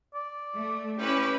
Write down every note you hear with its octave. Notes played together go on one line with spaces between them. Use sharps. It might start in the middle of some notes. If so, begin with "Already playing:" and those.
D5
A3
C#4 E4 G4 B4